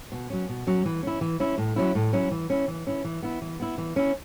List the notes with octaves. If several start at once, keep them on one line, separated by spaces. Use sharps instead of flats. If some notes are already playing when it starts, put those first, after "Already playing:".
B2
F#3 C#4
B2
F#3 C#4
E3
C#4 E4
E3
C#4 E4
A2
F#3 C#4 E4
A2
F#3 C#4 E4
E3
C#4 E4
E3
C#4 E4
E3
B3 E4
E3
B3 E4
E3
C#4 E4